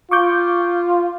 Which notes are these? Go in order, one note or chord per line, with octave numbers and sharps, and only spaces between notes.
F4 C#6 D6 G6